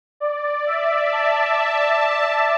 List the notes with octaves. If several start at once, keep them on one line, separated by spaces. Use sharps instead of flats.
D5
E5
A5